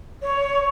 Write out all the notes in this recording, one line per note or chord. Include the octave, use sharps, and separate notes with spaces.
C#5